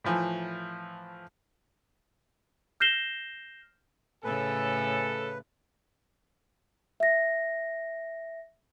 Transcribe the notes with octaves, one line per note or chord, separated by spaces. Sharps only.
A2 E3 F3
F6 G6 A#6 C7 E7 G7
A2 C#3 A4 B4 G#5
E5 A#6